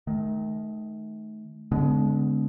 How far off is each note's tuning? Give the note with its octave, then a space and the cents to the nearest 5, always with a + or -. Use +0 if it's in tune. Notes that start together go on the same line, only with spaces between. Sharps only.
D#3 +0 A3 -40
D3 -35 G#3 +0 B3 +15